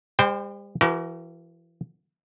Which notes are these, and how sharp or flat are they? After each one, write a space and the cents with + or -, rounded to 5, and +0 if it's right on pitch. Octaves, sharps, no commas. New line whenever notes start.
G3 +45 C5 -5 G5 +0
E3 +40 F#4 +45 A#4 +10